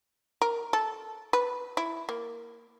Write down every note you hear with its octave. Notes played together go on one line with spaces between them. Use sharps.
A#4
A4
B4
E4
A#3